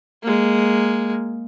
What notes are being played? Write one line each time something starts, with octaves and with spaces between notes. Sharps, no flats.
G#3 A#3